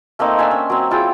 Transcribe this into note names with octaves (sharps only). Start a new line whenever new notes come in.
A3 A#3 C4 D#4
D4 E5 G#5 C6
C#4
F#3 C4
E4 F4 G#4 G5